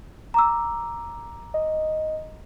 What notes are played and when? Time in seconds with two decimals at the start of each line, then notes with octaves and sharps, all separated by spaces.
0.34 A#5 D6 E6
1.54 D#5